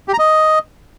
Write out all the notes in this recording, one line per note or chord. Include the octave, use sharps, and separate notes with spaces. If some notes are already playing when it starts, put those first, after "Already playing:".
G4
A#5
D#5